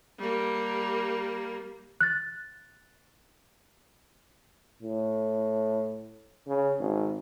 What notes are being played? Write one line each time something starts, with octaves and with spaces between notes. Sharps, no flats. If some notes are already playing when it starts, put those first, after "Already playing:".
G3 A#3
F#6 A6
A2
C#3
G#1